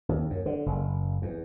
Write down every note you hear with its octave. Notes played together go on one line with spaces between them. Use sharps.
D#2
F#2
D3
F#1
E2